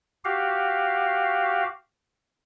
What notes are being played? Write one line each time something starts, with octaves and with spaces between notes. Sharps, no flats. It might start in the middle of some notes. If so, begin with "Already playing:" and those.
F#4 G4 F5